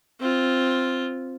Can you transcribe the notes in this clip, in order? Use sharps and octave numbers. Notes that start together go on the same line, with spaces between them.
C4 F4